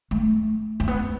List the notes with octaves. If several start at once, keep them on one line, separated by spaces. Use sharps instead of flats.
A3
A3
B3